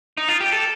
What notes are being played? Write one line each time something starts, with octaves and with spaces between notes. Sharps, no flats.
D#4
F4
G4
A4